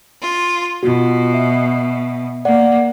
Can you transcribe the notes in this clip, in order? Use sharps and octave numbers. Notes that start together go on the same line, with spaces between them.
F4
B2 F4 F#4
E5
A#3 D5 F#5